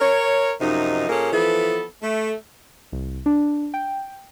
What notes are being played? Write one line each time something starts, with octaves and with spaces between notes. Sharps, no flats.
A#4 C#5
F#2 C3 F3 D#4
A#2 A#3 C#4 G#4 A4
E3 F3 B3 A4
A3
C2
D4
G5